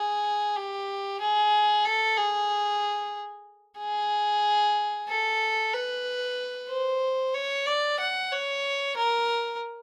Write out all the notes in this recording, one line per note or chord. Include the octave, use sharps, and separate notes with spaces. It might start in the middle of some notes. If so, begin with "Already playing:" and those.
Already playing: G#4
G4
G#4
A4
G#4
G#4
A4
B4
C5
C#5
D5
F#5
C#5
A#4